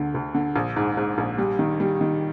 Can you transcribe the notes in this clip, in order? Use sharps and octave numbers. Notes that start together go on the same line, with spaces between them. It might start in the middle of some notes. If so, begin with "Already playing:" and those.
Already playing: D2 D3
D2
D3
A#1
G#2
G#2
A#1
G3
D#3
G3
D#3